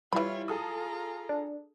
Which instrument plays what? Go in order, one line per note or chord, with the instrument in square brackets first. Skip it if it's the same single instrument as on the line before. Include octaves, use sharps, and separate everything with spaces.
[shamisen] E3 B5 [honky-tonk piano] G3 E4 [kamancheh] F4 C#5
[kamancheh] F4 A#5 [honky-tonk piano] G#4 A4 D#6
[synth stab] D4